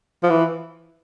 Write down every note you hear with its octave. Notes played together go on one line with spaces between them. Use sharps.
F3
E3